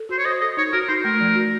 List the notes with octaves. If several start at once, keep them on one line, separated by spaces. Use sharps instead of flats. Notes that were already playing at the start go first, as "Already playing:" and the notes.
Already playing: A4
F#4 C5
C#5
C5 D#5
A4 D#5
D#4 C#5
F#4 A#4
D#4 C5
A3 A#4
F3
F#4